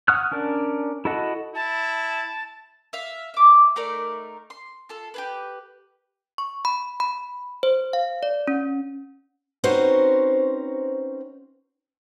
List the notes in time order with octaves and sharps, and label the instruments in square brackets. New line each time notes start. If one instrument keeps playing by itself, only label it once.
[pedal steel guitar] F#5 C#6 D#6 F6 F#6
C#4 D4 A#4 D5
E4 F#4 A4 D#5 F#5
[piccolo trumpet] E4 [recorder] A5
[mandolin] E5 F5
E5 D6
A3 D#4 A#4 D5
C6
F4 A4
G4 G#4 B4
[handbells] C#6
B5
B5
C5
F5
D5
C#4
[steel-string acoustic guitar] C4 C#4 D#4 F#4 B4 C5